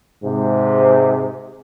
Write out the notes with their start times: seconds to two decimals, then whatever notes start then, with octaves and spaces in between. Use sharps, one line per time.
0.24 G#2 C3